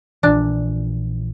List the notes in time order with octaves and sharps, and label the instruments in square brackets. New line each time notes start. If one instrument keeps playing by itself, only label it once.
[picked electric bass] A#1 A#2 E3 [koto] D4